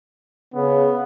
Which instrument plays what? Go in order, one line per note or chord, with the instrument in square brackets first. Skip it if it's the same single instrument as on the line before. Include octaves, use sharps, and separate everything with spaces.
[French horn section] C#3 [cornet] B3